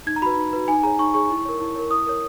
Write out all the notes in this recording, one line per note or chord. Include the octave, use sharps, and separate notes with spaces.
D#4 G#6
A#5
F#4 B4 B5
D#4
F#4 B4
D#4 G#5
G#4 C#5 A#5
D#4 C#6
G#4 C#5 C#6
E4
A#4 C#5
E4
A#4 C#5
E4 D#6
A#4 C#5